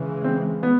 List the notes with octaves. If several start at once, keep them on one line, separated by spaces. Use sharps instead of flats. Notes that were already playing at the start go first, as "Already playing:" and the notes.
Already playing: C#3 E3 G#3
C4
B3